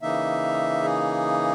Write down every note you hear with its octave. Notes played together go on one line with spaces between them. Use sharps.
C#3 E3 A#3 D#4 E5
G#4